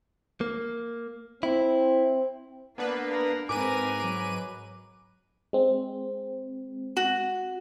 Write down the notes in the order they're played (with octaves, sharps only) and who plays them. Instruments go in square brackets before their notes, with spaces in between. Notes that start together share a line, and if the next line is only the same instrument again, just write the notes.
[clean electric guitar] A#3
[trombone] C4 [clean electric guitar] E4
[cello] A#3 [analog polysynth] B3 D4 B4
[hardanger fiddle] A#4
[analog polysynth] G#2 B4 D#7 [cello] C4 [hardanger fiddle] A#4 G#5 [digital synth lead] D6
[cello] F#3 [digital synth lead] D6
[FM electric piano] G#3 C4
[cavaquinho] F#4